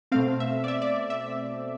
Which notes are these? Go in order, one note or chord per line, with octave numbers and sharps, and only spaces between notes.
B2 A3 C4 F5
E5
D5
E5
D5
E5